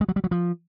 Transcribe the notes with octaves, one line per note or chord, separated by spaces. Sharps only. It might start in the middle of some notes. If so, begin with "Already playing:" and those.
G#3
F#3
G3
F#3
F3